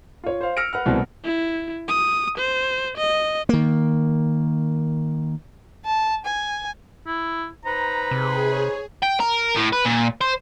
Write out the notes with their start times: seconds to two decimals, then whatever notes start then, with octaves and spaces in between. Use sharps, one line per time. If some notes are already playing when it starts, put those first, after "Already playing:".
0.24 F4 C#5
0.41 C5 F5
0.57 E6 F6 A#6 C#7 D7
0.73 B4 F#5 F6
0.86 C2 B2 E3 A3 B3 C4
1.25 E4
1.88 D#6
2.38 C5
2.97 D#5
3.49 D#3 A#3
5.86 A5
6.25 G#5
7.06 E4
7.64 D#4 B4 C5 A#5
8.11 C3 G#4
8.51 C#5
9.02 G5
9.20 A#4
9.56 A2
9.73 B4
9.85 A#2
10.21 C5